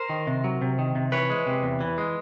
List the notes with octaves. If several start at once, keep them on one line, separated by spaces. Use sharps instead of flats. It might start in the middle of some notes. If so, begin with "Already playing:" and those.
Already playing: A#4 C5
D#3
C3
F#3
C3
D#3
C3
E3 B4 C#5
G#3
C3
E2
E3
G#3